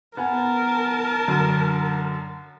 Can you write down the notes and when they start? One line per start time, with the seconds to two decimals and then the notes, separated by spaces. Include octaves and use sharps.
0.17 B3 A#4 F#5 G#5 A5
1.28 F#2 D3